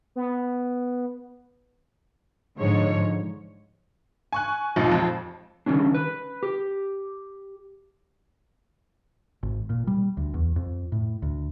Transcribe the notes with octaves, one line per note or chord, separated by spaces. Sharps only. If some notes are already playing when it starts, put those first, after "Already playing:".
B3
G#2 D3 F3 C#5
G#5 C#6 F#6
G#1 D#2 A#2 F3
F2
D3 D#3 F3 G3 C#4 D4
B4
G4
G#1
A#2
G3
D2
E2
F2
A2
D2